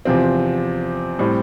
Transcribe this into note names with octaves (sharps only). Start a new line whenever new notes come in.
E2 C3 F3 C4
A2 G3 C4